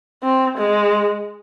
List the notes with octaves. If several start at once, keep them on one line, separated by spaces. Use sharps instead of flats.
C4
G#3